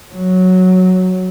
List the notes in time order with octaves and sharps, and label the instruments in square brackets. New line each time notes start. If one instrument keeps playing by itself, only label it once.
[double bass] F#3